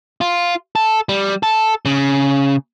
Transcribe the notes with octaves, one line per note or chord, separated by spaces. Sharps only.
F4
A4
G3
A4
C#3